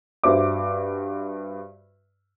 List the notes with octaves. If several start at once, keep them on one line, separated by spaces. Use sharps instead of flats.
G2 F#4 C5 E5 D6